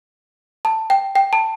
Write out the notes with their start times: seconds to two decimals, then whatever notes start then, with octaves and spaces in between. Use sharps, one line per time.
0.65 A5
0.90 G5
1.15 G5
1.33 A5